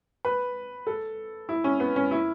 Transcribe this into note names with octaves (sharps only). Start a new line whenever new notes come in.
B4
A4
E4
C#4
B3
C#4
E4